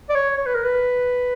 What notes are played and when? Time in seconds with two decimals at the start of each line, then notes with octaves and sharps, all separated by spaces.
0.09 D5
0.15 C#5
0.38 C#5
0.46 B4
0.55 A#4
0.64 B4